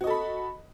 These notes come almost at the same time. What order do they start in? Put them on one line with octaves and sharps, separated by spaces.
F#4 D#5 A4 B5